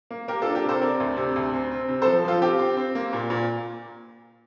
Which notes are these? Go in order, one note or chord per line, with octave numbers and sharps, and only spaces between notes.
A#3
A#3 G4 A#4
D4 F4 A4
G4 A#4
C3 A4 C5
C4 A#4 D5
D2
C3
D2
C4
C4
C3
F3 A4 C5
F3 F4 A4
C4 G4
C4
C4
A#3
A#2
A#2